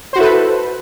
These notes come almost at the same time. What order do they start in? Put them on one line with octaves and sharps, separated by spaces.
C5 F#4 E4 A4 B4